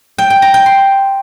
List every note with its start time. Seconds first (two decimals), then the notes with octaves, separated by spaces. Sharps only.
0.18 G5
0.30 G5
0.42 A#5
0.54 G5
0.66 C6